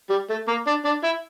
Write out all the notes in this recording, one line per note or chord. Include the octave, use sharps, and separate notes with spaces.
G3
A3
A#3
D4
D4
E4